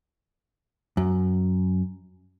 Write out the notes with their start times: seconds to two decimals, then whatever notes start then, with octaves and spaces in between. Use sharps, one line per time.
0.97 F#2